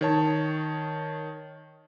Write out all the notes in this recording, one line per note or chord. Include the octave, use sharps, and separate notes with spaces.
D#3 C#5 A5